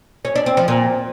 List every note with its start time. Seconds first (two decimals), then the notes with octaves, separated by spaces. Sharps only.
0.25 C#4
0.35 D4
0.46 C4
0.57 F3
0.68 A#2